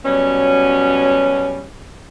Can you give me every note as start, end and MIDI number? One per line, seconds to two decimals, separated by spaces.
0.05 1.66 47
0.05 1.66 54
0.05 1.66 55
0.05 1.66 61